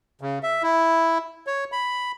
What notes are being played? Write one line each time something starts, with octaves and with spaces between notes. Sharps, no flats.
C#3
E5
E4
C#5
B5